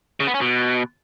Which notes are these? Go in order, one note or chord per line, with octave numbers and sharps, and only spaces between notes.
C#3
B3
C#4
B2